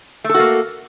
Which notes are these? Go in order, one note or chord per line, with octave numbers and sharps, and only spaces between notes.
A3 A#3 F#4 A4